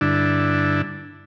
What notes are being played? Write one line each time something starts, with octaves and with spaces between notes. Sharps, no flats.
G2 D3 D4 E4